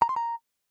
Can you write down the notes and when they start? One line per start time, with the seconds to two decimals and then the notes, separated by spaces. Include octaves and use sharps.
0.02 A#5
0.09 C6
0.16 A#5